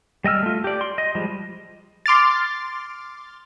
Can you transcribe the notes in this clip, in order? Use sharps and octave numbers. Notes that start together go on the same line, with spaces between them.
G3 D#5 G5 E6 F6
A3 F4
G4 D5
C6
D#5
F3 G3 G#3
C6 D6 F6 A6